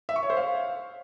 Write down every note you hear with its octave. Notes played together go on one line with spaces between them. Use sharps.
E5
C#6
C#5
C5
F5